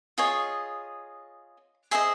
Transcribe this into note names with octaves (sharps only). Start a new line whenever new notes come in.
F4 G#4 C#5 D#5
G#4 C5 D#5 E5